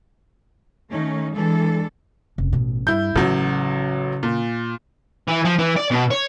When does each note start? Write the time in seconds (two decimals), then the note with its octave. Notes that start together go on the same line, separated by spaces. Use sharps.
0.91 D#3 A3 C#4 D#4
1.36 E3 G#3 D4 A4
2.38 F1 C#3
2.53 A1 B2
2.87 G2 E4 G6
3.16 A1 C#3 F#3
4.23 A#2
5.28 E3
5.45 F3
5.58 E3
5.77 D5
5.91 B2
6.11 C#5